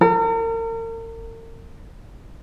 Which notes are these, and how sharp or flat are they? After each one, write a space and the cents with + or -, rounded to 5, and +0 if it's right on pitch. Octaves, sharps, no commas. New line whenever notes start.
A#4 -40